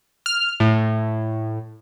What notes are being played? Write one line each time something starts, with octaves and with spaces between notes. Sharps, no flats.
F6
A2